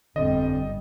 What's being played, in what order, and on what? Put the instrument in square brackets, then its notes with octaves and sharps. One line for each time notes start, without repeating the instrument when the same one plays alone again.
[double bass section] G1 G3 [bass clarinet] F2 [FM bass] D3 [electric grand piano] D#5